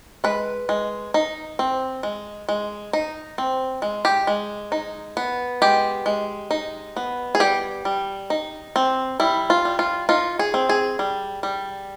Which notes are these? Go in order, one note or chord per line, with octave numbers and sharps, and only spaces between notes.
G#3 B4
G#3
D#4
C4
G#3
G#3
D#4
C4
G#3
G4
G#3
D#4
B3
G#3 G4
G#3
D#4
B3
G#4
G3 G4
G3
D#4
C4
G3 E4
F4
G3
F4
D#4 F4
G#4
C4
G#4
G3
G3